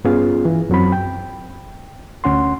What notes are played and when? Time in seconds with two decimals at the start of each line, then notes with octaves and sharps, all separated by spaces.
0.04 G2 B3 C#4 F4 G#4 F5
0.45 E3
0.70 F#2 F#3 C4 B5
0.92 G5
2.24 D2 C#4 F#5 C6